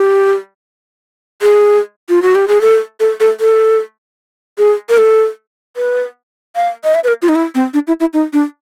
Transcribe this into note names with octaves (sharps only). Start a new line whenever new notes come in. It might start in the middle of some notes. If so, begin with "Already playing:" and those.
Already playing: G4
G#4
F4
F#4
G4
G#4
A4
A4
A4
A4
G#4
A#4
A4
B4
F5
D#5
E5
B4
A#4
F4
D#4
E4
C4
D4
E4
E4
D#4
D4